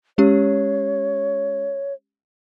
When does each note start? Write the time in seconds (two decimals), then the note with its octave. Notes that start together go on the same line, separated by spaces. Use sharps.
0.18 G#3 C#4 G4 C#5